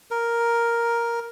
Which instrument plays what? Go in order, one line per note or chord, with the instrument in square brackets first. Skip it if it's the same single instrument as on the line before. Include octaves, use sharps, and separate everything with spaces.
[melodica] A#4